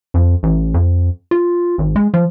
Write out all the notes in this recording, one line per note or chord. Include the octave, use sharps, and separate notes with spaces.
F2
A1
F2
F4
G#1
G#3
F3